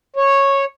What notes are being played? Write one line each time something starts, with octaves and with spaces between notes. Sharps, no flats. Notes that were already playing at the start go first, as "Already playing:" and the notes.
C#5